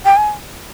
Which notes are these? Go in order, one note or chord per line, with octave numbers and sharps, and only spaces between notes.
G5
G#5